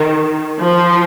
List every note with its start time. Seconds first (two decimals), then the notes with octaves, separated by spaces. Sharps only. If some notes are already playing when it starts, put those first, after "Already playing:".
Already playing: D#3
0.60 F3